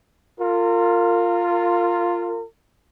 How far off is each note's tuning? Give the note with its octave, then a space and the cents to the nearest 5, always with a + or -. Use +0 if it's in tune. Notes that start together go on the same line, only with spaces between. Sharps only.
F4 +0 A#4 -35